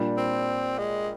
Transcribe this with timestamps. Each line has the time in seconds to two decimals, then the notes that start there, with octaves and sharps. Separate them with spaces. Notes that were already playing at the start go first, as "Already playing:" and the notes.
Already playing: A#2 G3 D4
0.17 C4
0.78 G#3